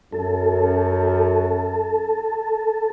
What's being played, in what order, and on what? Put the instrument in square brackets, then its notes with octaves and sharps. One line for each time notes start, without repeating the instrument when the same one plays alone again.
[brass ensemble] F#2 [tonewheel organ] A4